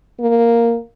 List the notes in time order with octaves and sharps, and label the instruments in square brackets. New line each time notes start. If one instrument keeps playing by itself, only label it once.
[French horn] A#3